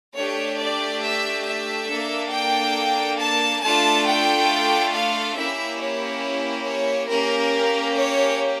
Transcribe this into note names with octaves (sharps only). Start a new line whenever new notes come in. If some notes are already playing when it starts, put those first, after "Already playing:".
A3 D4 G4 C#5
D5
E5
E5
A#3 D4 A4
G5
A5
A3 D4 F4 A4 A5
G5
F5
A#3 C#4 E4 G4 E5
C#5
C#5
A#3 C#4 G4 A#4
C#5